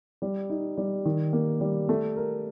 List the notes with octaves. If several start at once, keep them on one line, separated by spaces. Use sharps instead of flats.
G3
D#4
G3
D#3
A#3
G3
A3
A#4